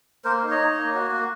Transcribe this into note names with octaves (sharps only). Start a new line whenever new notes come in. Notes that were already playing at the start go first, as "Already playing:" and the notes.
A#3 A#4 C5
D#4
C#5 D#5
D#4
A#3
F#4
A#3